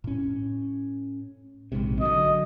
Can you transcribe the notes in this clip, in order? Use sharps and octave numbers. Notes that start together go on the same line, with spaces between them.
A2 C#4
A#1 G#2 C3
D3 F#3 D#5